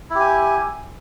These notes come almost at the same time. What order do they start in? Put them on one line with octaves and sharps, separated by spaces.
E4 G4 G#5